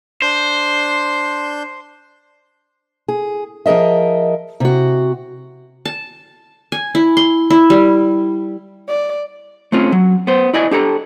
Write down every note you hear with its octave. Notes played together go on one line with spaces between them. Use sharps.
D4 C5 C6 G6
G#4
F3 G#4 A#4 D#5 E5
C3 F#4
A5
G#5
E4
C6
E4
G3
D5
A3 C4 C#4 F4
F#3
B3 C5
E4 D5 D#5 G#5
D4 G4 A4 A#5